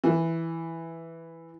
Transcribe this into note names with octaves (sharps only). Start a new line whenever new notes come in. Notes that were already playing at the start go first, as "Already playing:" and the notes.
E3